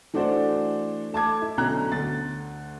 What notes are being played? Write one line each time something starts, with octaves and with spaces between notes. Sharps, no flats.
E3 A3 D4 F#4 C5 D5
A3 A5 D6 G#6
E4
B1 B2 D3 C#4 A#5 F#6
D2 A6